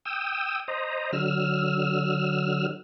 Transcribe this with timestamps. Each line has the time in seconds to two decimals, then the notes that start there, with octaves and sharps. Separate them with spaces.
0.05 G5 D#6 E6
0.68 C5 D#5 A#5
1.13 D3 F#3 E6 F6